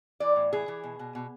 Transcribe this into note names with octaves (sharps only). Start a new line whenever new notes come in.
E3 D5
A2
E3 G#4
E3
B2
B2
B2